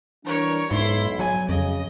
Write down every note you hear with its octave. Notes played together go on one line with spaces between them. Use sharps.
E3 G3 D4 A#4 C#5
B1 G#2 E4 C6
F#3 G#5
F2 C#3 D#5